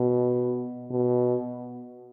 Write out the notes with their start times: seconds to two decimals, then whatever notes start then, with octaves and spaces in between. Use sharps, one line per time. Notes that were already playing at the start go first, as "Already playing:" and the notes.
Already playing: B2
0.91 B2